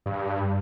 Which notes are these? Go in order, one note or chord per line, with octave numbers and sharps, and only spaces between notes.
G2